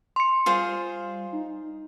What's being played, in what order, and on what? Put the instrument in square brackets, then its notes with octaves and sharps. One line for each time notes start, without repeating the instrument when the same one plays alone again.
[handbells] C6 C#7
[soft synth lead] G3 [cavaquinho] F4 G#4 C5
[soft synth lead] D#4